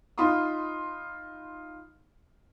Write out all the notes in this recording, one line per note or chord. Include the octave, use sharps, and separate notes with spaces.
D#4 F4 B5 C6 D#6